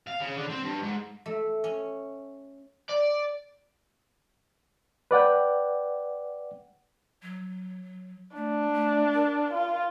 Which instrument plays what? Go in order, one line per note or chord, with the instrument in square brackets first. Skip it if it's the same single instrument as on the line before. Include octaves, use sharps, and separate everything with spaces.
[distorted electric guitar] F5
C#3
D3
C4
G2
G#2
[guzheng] A3
C#4
[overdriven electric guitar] D5
[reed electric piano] B4 D5 F#5 G5
[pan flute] F#3
[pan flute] A3 [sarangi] D4
[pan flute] A3
A#4
[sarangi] F4